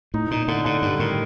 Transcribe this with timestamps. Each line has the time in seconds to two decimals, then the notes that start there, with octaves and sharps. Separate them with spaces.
0.14 A2 D#4
0.31 A#2 D#4
0.48 A2 D3
0.65 A2 D3
0.82 G2 G3
1.00 A2 D#3